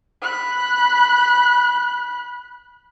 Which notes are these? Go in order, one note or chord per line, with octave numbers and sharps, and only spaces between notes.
B5 F#6